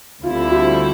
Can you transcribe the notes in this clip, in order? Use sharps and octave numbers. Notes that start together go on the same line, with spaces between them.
D2 D3 G3 C4 E4 F4
F#4